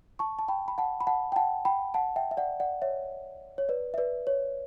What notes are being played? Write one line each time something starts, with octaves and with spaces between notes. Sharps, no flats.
A5 C#6
A5
G5 B5
B5
F#5 A5
B5
F#5 A5
G5
F#5 A5
G5 B5
F#5 A5
E5 G5
E5
D5 F#5
D5 F#5
C#5 E5
C#5
B4 D5
E5
B4 D5
C#5